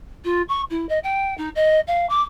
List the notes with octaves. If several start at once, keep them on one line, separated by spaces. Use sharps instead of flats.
F4
C#6
E4
D#5
G5
D#4
D#5
F5
D6